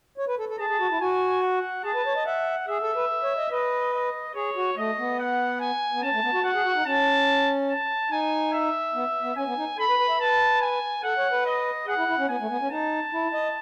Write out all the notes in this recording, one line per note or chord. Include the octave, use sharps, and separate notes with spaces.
C#5
B4
A4
A4
G#4 A5
G#4
F#4
E4
F#4 G#5
F#5
G#4 A5
B4
C#5
D#5
E5 F#5
G#4 E5
A4
B4
C#5
D#5
B4 D#5
D#5
G#4 C#5
F#4
A3 D#5
B3
F#5
G#5
B3
C#4 A5
A3
B3
F#4
F#4 F#5
G#4
F#4
D#4
C#4 A5
A5
D#4 G#5
E5
B3
B3
C#4 G#5
B3
D#4
A4 B5
B4
B4
E5
B4 A5
G#5
A4 F#5
C#5
B4
D#5
G#4 F#5
E4
E4
C#4
B3 G#5
A3
B3
C#4
D#4 A5
E4
D#5